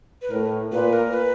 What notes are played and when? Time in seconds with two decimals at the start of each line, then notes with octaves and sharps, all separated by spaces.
0.22 B4
0.31 A2 A#4
0.72 A#2 B4
0.93 A#4
1.13 B4